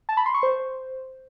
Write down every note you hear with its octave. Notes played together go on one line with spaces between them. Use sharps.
A5
B5
C6
C#6
C5